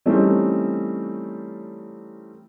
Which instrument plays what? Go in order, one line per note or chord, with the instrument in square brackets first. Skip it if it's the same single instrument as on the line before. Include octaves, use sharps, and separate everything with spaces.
[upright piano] E3 G3 A3 C4 C#4 D#4